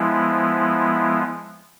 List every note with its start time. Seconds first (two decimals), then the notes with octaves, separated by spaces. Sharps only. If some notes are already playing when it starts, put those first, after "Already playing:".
Already playing: F3 G#3 B3 E4